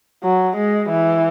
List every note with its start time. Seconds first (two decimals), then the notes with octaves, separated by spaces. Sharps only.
0.23 F#3
0.56 G#3
0.89 E3